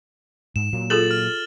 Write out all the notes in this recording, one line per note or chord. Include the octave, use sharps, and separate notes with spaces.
G#2 E7
A#2 F#3 A#3
F4 G#4 A4 A6 E7 F#7
F6